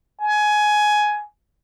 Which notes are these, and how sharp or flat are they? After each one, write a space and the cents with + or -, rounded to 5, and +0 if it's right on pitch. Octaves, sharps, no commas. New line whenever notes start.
G#5 +15